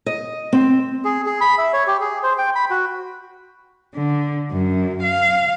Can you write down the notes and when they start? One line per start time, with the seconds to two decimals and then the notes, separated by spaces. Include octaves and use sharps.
0.06 D#5
0.53 C4
1.05 G#4
1.26 G#4
1.41 B5
1.58 E5
1.73 C#5
1.87 G4
2.01 G#4
2.23 C5
2.38 G5
2.55 B5
2.70 F#4
3.94 D3
4.51 F#2
5.03 F5